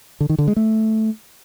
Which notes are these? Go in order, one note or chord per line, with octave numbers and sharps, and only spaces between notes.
D3
D#3
D3
G#3
A3